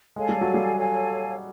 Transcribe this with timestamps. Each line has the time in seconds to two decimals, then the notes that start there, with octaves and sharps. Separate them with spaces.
0.16 G#3 A4 C#5 F5 G#5
0.29 G3
0.41 F#3
0.54 G3
0.75 A4 C#5 F5 G#5